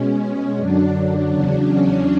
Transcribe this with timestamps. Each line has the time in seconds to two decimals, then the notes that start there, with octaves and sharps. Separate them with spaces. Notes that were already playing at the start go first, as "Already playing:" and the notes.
Already playing: B2 G#3 C#4
0.22 C#4
0.57 F#2 D3 F#3 D4
1.30 E2 C#3 F#3 D4
1.66 C#4